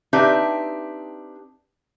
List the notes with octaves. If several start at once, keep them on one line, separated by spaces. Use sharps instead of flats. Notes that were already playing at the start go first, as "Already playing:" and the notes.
C4 D4 D#4 G4 B4 E5